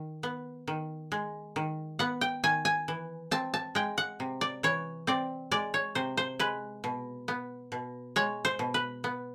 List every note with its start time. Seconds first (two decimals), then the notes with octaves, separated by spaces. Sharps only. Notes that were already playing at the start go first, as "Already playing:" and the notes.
Already playing: D#3
0.23 B3
0.68 D#3
1.12 G#3
1.56 D#3
1.99 B3 F#5
2.21 G5
2.44 D#3 G#5
2.65 G#5
2.88 E3
3.31 C4 A5
3.54 A5
3.75 G#3 G5
3.98 F#5
4.20 C3
4.41 D5
4.63 E3 C#5
5.07 C4 D5
5.51 G#3 D5
5.74 C#5
5.95 C3 C5
6.17 C5
6.39 G#3 B4
6.84 B2
7.28 B3
7.72 B2
8.16 G#3 C#5
8.45 C5
8.59 B2
8.74 B4
9.04 B3